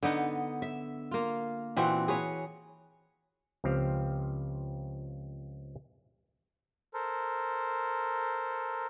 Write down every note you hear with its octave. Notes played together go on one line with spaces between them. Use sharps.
D3 B3 D#4
E5
A#3 F4
A#2 E3 C4 F#4
G#4 B4 C#5
C#2 F3 C4 G4 F5
A4 A#4 C5